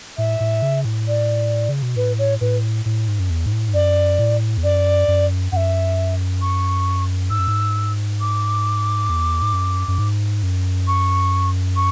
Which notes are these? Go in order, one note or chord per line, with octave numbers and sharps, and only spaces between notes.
A2 E5
A2
C#3
A2
D5
C#3
B2
A2 B4
C#5
A2 B4
A2
G#2
F#2
E2
G#2
A2
G#2
F#2 D5
A2
E2
F#2 D5
F#2
F#2 E5 F#5
C#6
G#2 E6
F#2
G#2
D6
E2
G#2
F#2
F#2
G#2
F#2
C#6
C#6